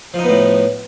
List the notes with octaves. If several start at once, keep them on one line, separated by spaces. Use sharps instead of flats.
A2 F3 B3 D#4